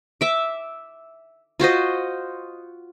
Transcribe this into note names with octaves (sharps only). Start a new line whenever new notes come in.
E5 D6
F4 F#4 C5 D#5